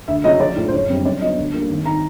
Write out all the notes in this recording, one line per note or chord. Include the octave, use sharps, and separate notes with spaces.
D2 E5
C#3 F#3 D#5
A#1 D5
A2 F3
C5
F#1 C#5
F#2 D3 G3 C4
F#2 D5
D3 F#3 B3 D#5
D2
D3 G3 A#3
G#1
D#3 A#5